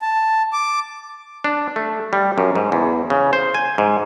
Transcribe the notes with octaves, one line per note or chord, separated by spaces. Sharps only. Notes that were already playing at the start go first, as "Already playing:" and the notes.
A5
D6
D4
A3
G3
F#2
G#2
E2
C#3
C5
G#5
G#2